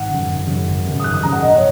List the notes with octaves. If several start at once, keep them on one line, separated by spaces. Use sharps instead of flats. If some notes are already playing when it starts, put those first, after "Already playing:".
Already playing: G#1 F#5
F#2 C#3
G#1
F#2 C#3
G#1
F#2 C#3
D#6
G#1 F#6
D#6
F#2 C#3 A#5
F#5
A#1 D#5
C#5